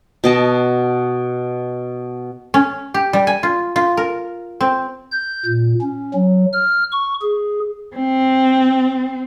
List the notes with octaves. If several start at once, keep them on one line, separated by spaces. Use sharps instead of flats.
B2 D#5 A5
C#4
G4
G3
G#5
F4
F4
A#4
C4
G6
A#2
C#4
F#3
F6
C#6
G#4
C4